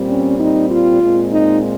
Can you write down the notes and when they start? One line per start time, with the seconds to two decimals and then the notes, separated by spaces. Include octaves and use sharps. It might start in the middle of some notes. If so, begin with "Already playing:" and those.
Already playing: A#2 G3 C4
0.09 C#4
0.40 D#4
0.70 F4
1.01 A#2 G#3 C4
1.33 D#4